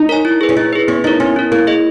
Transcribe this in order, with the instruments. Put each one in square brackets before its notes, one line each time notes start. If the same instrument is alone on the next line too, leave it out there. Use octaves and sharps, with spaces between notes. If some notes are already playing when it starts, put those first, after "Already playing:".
Already playing: [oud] D#4
[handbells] A#4 C#5 G#5
E4
G#4 B4
[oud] C#4
[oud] D#4 [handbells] E4
[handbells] G#4 B4
[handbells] B3 [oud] C#4
[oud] D#4 [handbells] E4 A#4
[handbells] B3 [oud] C#4
[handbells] E4 A#4
[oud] A#3 [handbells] E4
[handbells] G#4 D#5